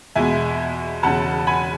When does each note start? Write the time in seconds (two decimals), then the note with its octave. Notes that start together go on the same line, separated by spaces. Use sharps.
0.15 E2 B2 G#3 E5 G#5
1.03 E1 E2 C#3 F#5 A5
1.47 G#5 B5